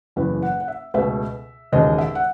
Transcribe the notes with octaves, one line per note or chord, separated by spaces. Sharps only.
F#1 E2 C#3 E3 B4
F#5
F#5
E5
C#2 B2 A3 E5
E1 D#2 C#3 G#3 D#5
E5
F#5